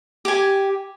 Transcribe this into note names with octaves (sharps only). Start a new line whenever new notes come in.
G4 G#5